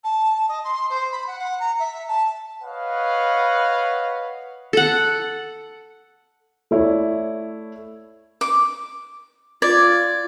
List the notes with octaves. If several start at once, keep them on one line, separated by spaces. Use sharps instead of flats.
A5
D#5
C6
C5
B5
F#5
F#5
A#5
E5
A5
B4 C#5 D#5 F5 F#5
A4 F#5
A3 E4 C#5 D5
D6
F4 D5 G#6